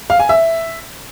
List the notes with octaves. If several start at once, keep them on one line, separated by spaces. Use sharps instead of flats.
F5
G#5
E5